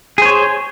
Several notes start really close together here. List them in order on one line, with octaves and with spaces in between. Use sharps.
G#4 C5 C#5